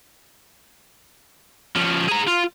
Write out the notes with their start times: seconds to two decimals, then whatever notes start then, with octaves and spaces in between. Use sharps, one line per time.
1.76 F3 C#4
2.09 G#4 A#5
2.28 F4